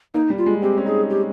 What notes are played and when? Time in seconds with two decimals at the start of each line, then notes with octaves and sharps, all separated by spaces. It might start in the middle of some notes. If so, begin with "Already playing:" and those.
0.14 A#3 D#4
0.30 G3
0.38 F4
0.46 G#3
0.62 C4 G4
0.78 C#4
0.86 D#4 G#4
1.10 G4